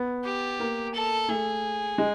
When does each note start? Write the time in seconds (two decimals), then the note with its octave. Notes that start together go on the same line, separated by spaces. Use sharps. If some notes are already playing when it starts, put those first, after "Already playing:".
Already playing: B3
0.25 G4
0.60 A#3
0.94 A4
1.29 A3 G#4
1.98 G#3